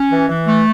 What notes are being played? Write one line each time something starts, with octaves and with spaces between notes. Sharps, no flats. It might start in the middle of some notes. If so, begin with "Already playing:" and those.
Already playing: C#4
E3
E3
A3